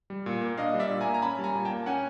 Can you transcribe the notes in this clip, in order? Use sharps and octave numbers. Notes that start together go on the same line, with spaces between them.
G3
A#2
A#3
D4 D#5 F5
G3
D5 E5
A#2
G#5 A#5
A#3
A#5
C#4 A5 B5
G3
G#5 A#5
A#2
G5 A5
A#3
C#4 F#5 G#5